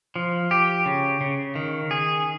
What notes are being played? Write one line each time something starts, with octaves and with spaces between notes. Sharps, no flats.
F3
G4
C#3
C#3
D#3
G#4